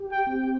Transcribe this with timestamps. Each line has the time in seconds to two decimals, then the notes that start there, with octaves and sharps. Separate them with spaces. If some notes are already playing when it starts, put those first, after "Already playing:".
Already playing: G4
0.12 G5
0.27 C4